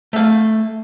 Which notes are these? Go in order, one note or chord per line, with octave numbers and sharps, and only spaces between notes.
A3 F5